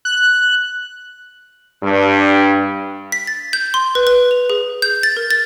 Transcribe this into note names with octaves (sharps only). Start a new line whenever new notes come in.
F#6
G2
B6
A6
G6
C6
B4
B4
F7
G#4
G6
A6
A#4
A6